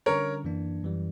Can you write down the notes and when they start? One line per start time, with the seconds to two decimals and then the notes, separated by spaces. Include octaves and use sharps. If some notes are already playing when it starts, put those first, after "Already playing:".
0.06 D3 G3 C#4 A#4 C#5
0.44 F#2 E3 A#3 D4
0.83 F#2 E3 G3